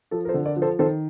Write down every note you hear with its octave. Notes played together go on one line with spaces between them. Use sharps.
F3 A4
A#4
A4 C5
D3
A#4 D5
F3
A4 C5
D#3 A4 C5